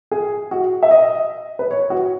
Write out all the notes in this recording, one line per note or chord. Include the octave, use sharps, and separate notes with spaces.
G#4
F#4
E5
D#5
B4
C#5
F#4